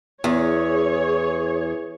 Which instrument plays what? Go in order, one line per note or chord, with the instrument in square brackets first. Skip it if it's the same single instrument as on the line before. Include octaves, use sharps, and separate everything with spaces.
[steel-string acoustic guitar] E2 [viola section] G#4 C#5